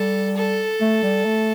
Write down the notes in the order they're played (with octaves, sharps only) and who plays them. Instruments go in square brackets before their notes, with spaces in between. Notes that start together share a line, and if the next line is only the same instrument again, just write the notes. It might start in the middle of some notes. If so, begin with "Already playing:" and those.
Already playing: [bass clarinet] G3 [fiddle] A4
[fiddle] A4
[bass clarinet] A3
G3
A3